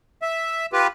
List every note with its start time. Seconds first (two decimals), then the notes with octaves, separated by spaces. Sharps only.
0.22 E5
0.73 F4 G4 B4